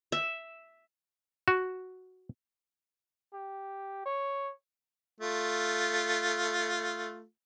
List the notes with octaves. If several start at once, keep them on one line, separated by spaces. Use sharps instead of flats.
E5
F#4
G4
C#5
A3 F4